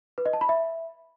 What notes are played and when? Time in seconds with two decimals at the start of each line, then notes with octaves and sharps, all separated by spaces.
0.18 B4
0.26 D#5
0.33 A5
0.41 B5
0.49 E5